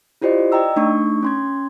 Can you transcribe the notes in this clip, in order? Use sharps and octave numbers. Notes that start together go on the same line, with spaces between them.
E4 F4 G4 C5 D5 D#5
D5 D#5 G5 A#5 E6
A3 D4 D#4 C#6
C#4 C6 G#6